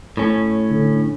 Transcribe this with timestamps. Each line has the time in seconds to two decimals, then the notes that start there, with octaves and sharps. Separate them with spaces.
0.17 A2 C#4
0.70 D3